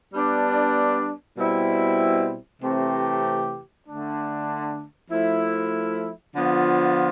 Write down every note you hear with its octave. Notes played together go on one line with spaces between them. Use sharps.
G3 B3 D4
B2 G3 C4 E4
C3 E3 A3 C4 G4
D3 A3 D4
F3 A3 E4
D3 F3 B3 F4